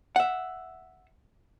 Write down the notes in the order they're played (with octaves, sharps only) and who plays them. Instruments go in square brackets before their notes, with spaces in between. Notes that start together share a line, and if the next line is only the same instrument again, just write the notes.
[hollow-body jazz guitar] E5 F#5